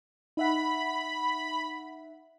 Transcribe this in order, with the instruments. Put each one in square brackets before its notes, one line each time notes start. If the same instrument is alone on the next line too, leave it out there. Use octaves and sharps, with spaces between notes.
[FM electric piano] D#4 E5 F#5 [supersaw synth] B5